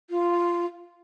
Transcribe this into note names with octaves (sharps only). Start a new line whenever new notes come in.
F4